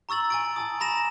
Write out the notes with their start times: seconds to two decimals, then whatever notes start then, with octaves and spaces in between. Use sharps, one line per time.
0.09 A#5 C#6 E6 A6 F#7
0.30 G#5 A6 D7
0.56 G#5 A5 D#6
0.80 G#5 A#5 B5 A#6 E7